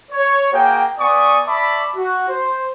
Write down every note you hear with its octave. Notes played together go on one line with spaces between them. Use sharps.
C#5
A#3 F#4 G#4 G5
B3 D5 G#5 C#6 D#6
D5 E5 A5 B5 C#6 D6
F#4
C5